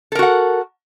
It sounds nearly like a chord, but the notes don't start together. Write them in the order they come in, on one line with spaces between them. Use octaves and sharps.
A4 A#4 F#4 F#5